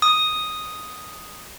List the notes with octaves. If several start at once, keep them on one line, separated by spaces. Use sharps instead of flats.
D#6